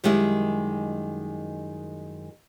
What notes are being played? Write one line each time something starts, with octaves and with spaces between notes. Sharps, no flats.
F#2 D#3 G3 G#3 E4